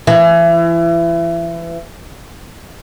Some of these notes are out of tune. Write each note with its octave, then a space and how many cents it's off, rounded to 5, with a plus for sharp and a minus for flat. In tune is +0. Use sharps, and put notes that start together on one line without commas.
E3 +30